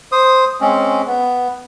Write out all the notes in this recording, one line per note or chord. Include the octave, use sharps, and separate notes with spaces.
C5 D#6
G#3 C4 C#4
B3